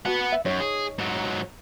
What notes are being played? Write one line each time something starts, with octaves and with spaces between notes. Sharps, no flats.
B3 F#4 B4 F#5 A5
E5
F#2 D#4 C#5
G#4
G#2 F#3
A#5